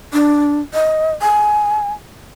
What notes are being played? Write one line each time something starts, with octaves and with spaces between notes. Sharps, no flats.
D4
D#5
G#5